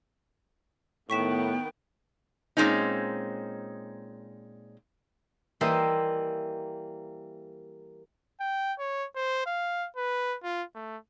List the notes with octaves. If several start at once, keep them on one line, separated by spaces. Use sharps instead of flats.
A2 D#3 B3 G5 C#6 B6 E7
A#2 G#3 C4 C#4 D#4
E3 G3 A#3 C5 D#5 E5
G5
C#5
C5
F5
B4
F4
A3